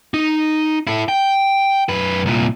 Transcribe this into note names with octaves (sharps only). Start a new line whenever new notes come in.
D#4
E4 A4
G5
F#2 B4
C2 A#2